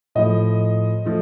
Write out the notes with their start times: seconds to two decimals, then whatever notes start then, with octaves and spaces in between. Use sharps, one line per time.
0.15 A2 F3 A3 D#5
1.05 F3 A3